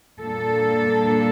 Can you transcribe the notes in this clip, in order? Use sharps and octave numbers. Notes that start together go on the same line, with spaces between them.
A#2 G3 A#3 D4 A4